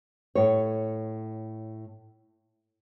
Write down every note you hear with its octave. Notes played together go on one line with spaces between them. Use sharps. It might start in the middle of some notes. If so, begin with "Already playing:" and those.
A2 C#5